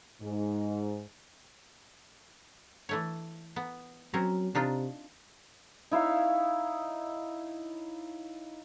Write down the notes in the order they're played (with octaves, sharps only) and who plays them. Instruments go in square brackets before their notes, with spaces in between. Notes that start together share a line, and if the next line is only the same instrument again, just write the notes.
[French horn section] G#2
[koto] E3 A3 C#5
B3
[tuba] F#3 [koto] C4 C#4 A#4
[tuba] C3 [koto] D4 D#4 F4
[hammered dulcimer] D#4 E4 C#5 F5